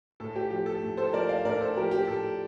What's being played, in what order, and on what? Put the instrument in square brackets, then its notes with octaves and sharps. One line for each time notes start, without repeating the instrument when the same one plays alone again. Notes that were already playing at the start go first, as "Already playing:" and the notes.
[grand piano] A2 A4
G4
F3 G4
A4
A2
A4 C5
F3 A#4 D5
D5 F5
A2 A#4 D5
A4 C5
F3 G4 A#4
G4
A2 A4